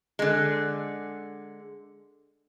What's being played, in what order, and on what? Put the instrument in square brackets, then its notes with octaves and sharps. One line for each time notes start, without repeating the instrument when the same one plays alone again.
[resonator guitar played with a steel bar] D3 G#3